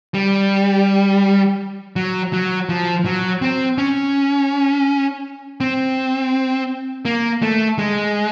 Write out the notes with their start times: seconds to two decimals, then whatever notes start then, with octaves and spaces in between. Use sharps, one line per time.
0.14 G3
1.96 F#3
2.33 F#3
2.69 F3
3.06 F#3
3.42 C4
3.78 C#4
5.60 C4
7.05 A#3
7.42 A3
7.79 G#3